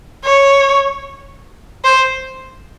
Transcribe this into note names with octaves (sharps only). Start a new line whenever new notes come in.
C#5
C5